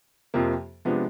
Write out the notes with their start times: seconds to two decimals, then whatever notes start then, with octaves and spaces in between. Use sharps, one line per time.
0.34 F2 C3 F3 A#3
0.85 C3 F3 G#3 B3 D4